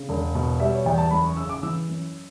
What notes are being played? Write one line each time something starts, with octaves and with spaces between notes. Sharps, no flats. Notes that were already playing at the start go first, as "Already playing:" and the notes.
Already playing: C#3
E1
B2
G3 E5
C#5
E2 G5
A5
F#1 B5
C#6
C#3 E6
D6
E3 E6
F#2